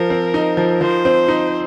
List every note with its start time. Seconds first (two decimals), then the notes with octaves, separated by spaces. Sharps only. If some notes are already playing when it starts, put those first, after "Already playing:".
Already playing: F3 A#4
0.10 C4
0.34 D#4
0.57 F3
0.81 F3 C5
1.05 C4
1.28 D#4